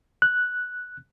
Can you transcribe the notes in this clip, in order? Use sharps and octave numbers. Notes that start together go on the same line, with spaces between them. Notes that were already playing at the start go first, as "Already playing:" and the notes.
F#6